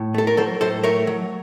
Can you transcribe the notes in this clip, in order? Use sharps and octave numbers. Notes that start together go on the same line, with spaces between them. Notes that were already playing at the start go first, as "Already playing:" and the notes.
Already playing: A2
A3 A4
A#4
F#3 A4 C5
A2 A4 C5
A3 A#4 C#5
F#3